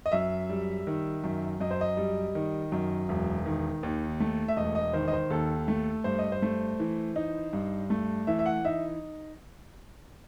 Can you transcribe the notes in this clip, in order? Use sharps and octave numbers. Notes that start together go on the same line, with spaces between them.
D#5
F#2 E5
G3
D#3
F#2
F#2 D#5
C5
D#5
G3
D#3
F#2
E1
D#3
D#2
A3
E5
E1 D#5
D#5
D#3 C5
D#5
C5
D#2 A4
A3
G2 C5
D#5
C5
A3
E3
D#4
G2
A3
E3 E5
E5
F#5
D#4 E5